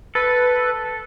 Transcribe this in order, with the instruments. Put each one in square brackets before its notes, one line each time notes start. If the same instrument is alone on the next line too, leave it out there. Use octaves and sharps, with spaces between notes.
[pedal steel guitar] A4 [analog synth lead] B4